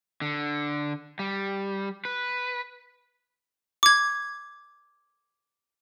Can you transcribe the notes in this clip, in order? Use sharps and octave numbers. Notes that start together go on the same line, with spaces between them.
D3
G3
B4
D6 G#6